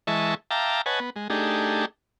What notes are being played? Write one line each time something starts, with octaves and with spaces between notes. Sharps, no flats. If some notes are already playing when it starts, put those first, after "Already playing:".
E3 G#3 D#5 E5 A5 C#6
E5 F5 G5 A5 A#5 D6
B4 C#5 D#5 F#5 G#5 A5
B3
G#3
A3 D4 D#4 G4 G#4